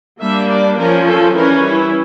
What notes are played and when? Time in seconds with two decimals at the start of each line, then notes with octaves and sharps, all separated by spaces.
0.20 G3 A#3 D4 E5
0.49 D5
0.78 F3 C#4 A#4
1.07 A4
1.35 E3 G3 C#4 A#4
1.64 E4